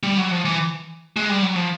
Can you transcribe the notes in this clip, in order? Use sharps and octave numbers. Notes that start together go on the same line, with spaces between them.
G3
F#3
F3
E3
G#3
G3
F#3
F3